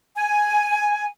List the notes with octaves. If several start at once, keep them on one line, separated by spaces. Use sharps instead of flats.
G#5